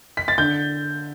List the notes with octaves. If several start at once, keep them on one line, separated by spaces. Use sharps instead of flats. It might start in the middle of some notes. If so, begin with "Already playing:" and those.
B6
A6
D3 G6